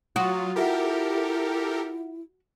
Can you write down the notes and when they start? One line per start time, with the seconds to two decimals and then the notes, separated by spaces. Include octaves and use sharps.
0.16 F#3 F4 F#4 D#6
0.56 E4 F4 G4 A4 A#4 E5 F#5